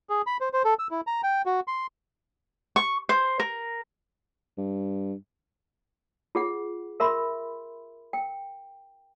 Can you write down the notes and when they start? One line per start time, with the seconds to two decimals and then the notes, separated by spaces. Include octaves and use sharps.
0.10 G#4
0.27 B5
0.41 C5
0.53 C5
0.65 A4
0.79 E6
0.91 E4
1.07 A#5
1.23 G5
1.46 F#4
1.68 C6
2.76 C#6
3.09 C5
3.40 A#4
4.58 G2
6.35 F4 G#4 F#5
7.00 A#4 E5 B5 C6
8.13 G5